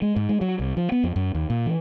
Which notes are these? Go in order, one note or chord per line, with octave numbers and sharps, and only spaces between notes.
G#3
G#2
G#3
F#3
C2
F3
B3
F2
F#2
D#2
A#2
E3